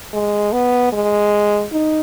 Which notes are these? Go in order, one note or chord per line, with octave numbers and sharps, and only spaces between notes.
G#3
B3
G#3
D#4